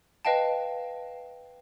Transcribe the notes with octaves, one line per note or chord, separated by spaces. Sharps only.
B4 D#5 F5 G5 A5